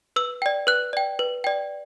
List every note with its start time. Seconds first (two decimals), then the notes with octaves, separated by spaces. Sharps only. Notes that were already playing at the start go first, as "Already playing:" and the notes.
0.16 B4 E6
0.42 D5 G5
0.67 B4 F#6
0.93 D5 G5
1.19 B4
1.44 D5 G5